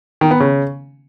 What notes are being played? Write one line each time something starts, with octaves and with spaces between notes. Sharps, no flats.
D#3
B3
C#3